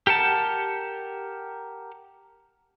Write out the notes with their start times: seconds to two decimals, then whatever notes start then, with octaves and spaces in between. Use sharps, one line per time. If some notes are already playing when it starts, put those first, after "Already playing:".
0.07 G4 A#4 F#5 A5